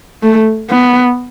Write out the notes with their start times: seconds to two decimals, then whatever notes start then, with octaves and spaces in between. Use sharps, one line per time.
0.23 A3
0.70 B3